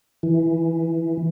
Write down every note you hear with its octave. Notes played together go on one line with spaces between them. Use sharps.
E3